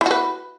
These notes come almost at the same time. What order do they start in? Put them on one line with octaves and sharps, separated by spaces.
E4 F#4 B4